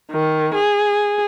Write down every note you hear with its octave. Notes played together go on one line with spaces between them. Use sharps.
D#3
G#4